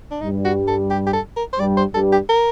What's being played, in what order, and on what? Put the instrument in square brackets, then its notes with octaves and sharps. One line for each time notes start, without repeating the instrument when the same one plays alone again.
[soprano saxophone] D4
[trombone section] G2 G3 [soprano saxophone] D#4
[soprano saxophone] F#4
A4
G4
G4
A4
A#4
C5
[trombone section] G2 G3 [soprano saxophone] D5
[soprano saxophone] C5
[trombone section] G2 G3 [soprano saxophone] A4
[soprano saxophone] G4
A#4